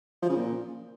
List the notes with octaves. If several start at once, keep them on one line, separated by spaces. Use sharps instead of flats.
F3
C#3
A#2